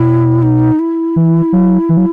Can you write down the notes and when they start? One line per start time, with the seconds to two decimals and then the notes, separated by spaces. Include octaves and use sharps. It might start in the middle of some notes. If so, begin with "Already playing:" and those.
Already playing: B2 E4
0.42 D#4
0.79 E4
1.16 E3
1.53 F#3
1.89 E3
1.97 F#3